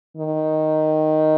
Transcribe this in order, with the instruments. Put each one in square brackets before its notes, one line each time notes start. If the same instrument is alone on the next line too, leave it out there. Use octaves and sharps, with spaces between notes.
[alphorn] D#3